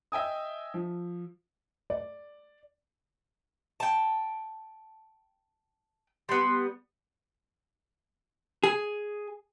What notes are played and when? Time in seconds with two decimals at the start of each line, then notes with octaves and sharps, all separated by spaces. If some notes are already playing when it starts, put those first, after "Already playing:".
0.12 D#5 E5 G5 G#5 D#6
0.74 F3
1.90 D5
3.80 G5 A5
6.29 G3 B3 C6
8.63 G#4